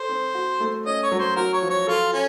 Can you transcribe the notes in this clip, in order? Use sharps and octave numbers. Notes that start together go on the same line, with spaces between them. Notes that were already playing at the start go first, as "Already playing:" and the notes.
Already playing: A4 C5
C4
F#4
A3
C#4 D#5
C#5
F#3
C5
F#4 A#4
C#5
F3
C#5
F4 A4
C#4